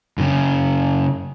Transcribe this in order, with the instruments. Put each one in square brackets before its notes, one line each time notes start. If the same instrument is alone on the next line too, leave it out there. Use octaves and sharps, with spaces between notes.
[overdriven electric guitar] F#2 C#3